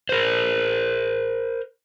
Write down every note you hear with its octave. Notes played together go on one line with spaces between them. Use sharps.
A#4 C5